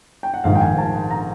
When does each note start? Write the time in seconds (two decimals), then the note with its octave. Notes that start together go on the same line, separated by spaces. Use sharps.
0.23 G5
0.34 F#5
0.44 A#1 G#2 D#3 F5
0.55 G5
0.61 G#5
0.78 A5
1.10 A#5